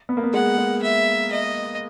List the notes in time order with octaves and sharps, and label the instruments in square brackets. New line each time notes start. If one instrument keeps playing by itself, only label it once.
[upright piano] B3
A#3
B3
[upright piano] G#3 [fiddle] F#5
[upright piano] G#3
[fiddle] E5
D#5